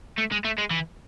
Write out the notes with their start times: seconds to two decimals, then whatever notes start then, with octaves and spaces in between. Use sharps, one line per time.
0.18 A3
0.32 G#3
0.45 A3
0.58 G#3
0.71 E3